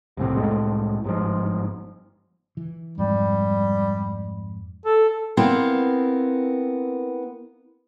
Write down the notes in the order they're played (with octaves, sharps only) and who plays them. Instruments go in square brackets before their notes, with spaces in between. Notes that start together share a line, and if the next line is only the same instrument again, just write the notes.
[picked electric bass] C2 F2 A2 C3
C2 A2 G#3 A3
G1 G#2 F3
[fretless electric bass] E3
[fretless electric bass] F2 G#2 [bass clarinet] G3
[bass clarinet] A4
[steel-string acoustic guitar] B3 C4 E4 A#4 F5